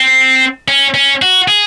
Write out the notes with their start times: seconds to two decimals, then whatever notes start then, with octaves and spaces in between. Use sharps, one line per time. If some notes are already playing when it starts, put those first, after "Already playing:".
Already playing: C4
0.68 C#4
0.94 C#4
1.22 F#4
1.48 G#4